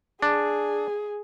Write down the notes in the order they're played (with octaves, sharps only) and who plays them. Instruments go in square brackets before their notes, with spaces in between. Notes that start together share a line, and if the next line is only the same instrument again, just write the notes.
[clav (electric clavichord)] D4 [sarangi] G#4